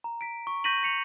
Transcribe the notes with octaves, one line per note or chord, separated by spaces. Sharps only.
A#5
B6 D7
C#6
C#6 G6 A#6 B6 D#7 F#7
B6 C#7 F7